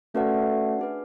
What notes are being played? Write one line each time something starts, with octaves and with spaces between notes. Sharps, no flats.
A3 C#4 F#4 B4 D5 F#5
D4 G#4 B4